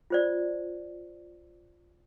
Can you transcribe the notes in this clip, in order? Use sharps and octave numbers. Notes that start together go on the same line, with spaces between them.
F4 C5 D5